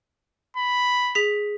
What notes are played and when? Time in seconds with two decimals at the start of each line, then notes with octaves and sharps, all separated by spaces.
0.57 B5
1.15 G#4 B6 F7